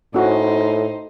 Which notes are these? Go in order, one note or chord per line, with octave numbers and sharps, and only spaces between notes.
A2 C#4 D#4 F#4 C5